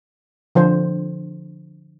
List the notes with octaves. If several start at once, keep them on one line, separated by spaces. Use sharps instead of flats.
D3 F3 C5